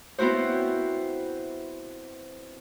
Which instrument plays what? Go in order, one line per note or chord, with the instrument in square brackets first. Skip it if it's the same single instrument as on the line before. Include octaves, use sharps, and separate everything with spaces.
[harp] B3 C4 E4 F#4 C5